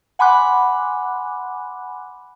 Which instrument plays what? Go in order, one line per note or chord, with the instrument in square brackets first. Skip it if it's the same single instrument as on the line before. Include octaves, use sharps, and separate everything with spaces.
[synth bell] F#5 G#5 B5 C6 D6 F#6